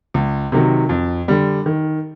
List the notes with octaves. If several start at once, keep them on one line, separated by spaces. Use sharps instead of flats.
C#2
C3 D#3 F#3
F2
D3 G3
D#3